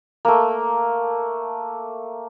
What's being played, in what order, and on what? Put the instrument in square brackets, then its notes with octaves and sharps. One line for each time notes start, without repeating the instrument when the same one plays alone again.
[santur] A3 A#3